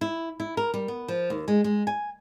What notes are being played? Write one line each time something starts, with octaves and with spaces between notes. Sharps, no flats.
E4
E4
A#4
G3
B3
F3
D#2
G#3
G#3
G#5